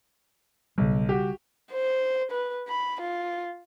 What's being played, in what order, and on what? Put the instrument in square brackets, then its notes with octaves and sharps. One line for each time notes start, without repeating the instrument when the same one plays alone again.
[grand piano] B1 [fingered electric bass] C#3 G3
[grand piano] F#4 G4
[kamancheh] C5
B4
B5
F4